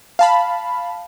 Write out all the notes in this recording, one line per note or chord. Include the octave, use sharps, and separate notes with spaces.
F5 A5 B5